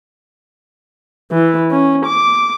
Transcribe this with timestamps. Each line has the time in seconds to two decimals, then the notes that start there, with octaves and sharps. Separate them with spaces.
1.32 E3
1.71 C#4
2.05 D6